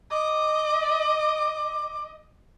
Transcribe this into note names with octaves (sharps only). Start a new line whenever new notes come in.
D#5 D6